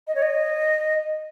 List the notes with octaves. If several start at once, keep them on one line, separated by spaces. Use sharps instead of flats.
D#5
C#5
D#5